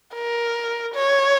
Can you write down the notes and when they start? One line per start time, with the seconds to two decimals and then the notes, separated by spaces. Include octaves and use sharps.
0.15 A#4
0.94 C#5